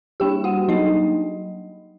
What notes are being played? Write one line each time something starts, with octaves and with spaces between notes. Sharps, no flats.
G3 A#3 D4 G4 G5
F#4 F#5
F#3 A#3 D4 D#4 D#5